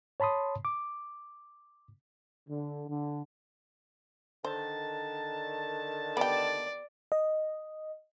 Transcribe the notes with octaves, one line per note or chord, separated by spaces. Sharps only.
C#5 A5 B5 C6 D#6
D6
D3
D3
D3 D#3 C5 A5
B3 G4 D5
D#5